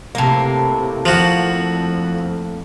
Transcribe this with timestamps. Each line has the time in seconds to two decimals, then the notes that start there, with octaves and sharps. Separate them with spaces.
0.15 A2 C3 A#3
1.06 F2 F3 F#4